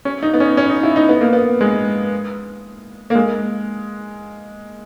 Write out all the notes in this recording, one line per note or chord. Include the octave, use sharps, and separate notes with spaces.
C#4
D#4
B3
C#4
C#4
D#4
E4
D#4
B3
A#3
B3
G#3
A#3
G#3